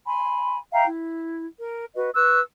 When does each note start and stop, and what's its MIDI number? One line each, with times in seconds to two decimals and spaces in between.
0.08 0.58 80
0.08 0.58 83
0.08 0.58 84
0.72 0.84 76
0.72 0.84 77
0.72 0.84 79
0.72 0.84 82
0.87 1.45 64
1.59 1.85 70
1.95 2.10 66
1.95 2.10 71
1.95 2.10 75
2.15 2.40 71
2.15 2.40 85
2.15 2.40 88
2.15 2.40 90